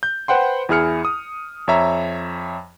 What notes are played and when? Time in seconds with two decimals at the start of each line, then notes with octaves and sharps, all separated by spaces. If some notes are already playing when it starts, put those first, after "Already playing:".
0.03 G6
0.28 B4 C5 F#5 G5 C6
0.69 E2 E4 G#4 F6 C#7
1.05 D#6
1.68 F2 C#5 E5 A#5